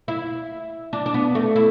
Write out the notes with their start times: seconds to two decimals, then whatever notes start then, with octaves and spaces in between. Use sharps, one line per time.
0.08 E4
0.93 D4
1.06 D4
1.14 B3
1.35 A3
1.56 E4